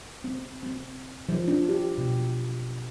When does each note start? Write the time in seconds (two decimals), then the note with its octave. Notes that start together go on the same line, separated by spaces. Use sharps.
0.24 C4
0.63 C4
1.29 F3
1.48 D4
1.69 G4
1.98 B2